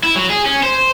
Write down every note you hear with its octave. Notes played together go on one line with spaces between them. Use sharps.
E4
F#3
G#4
C#4
C5